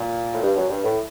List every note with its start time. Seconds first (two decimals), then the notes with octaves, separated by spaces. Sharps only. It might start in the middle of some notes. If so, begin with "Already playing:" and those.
Already playing: A#2
0.32 A2
0.43 G2
0.57 F#2
0.69 G2
0.84 A2